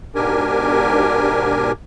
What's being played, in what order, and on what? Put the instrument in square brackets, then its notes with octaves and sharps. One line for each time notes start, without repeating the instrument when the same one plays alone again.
[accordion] G#2 B2 D4 G4 A#4 G#5